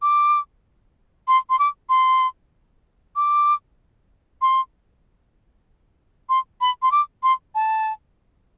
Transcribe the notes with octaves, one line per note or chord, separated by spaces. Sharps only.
D6
C6
C6
D6
C6
D6
C6
C6
B5
C6
D6
C6
A5